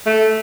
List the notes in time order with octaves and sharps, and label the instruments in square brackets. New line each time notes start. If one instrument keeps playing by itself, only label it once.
[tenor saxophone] A3